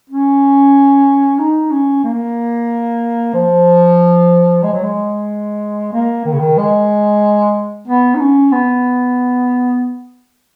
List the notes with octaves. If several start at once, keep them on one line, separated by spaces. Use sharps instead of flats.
C#4
D#4
C#4
A#3
F3
G#3
F#3
G#3
A#3
D#3
C#3
D#3
G#3
B3
D#4
C#4
B3